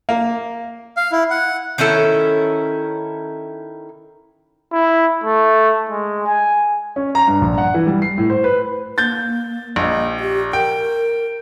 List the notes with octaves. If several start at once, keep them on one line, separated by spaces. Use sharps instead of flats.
A#3
F5
E4
F#5
D#3 C#4 E4 A4
E4
A3
G#3
G#5
C#4
A#5
G2
A#1
F#5
E3
G3
C7
A2
C5
B4
A#3 G6 A6
A#1 D#5
G4
A#4 G5